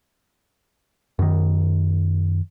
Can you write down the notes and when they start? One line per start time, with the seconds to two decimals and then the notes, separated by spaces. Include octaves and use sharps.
1.19 F#2 D#3